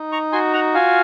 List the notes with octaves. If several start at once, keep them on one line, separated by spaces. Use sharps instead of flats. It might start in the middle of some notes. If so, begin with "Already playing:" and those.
Already playing: D#4
A#5 C#6
F#4 G#5 C6
F#5 A#5
F4 F5 G#5